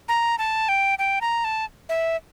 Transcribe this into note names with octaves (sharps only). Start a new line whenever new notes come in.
A#5
A5
G5
G5
A#5
A5
E5